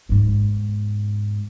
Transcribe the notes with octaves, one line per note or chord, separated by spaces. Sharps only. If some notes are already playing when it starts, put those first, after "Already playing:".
E2 G#2